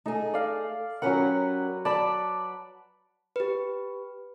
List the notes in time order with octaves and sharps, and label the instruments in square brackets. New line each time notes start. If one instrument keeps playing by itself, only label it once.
[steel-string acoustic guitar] A3 G#4 [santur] D#4
[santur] D5 F5
[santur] F#3 B4 F#5 [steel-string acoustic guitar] C#4 G4 A#4
[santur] D5 B5 [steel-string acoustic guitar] A5
[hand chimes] G4 B4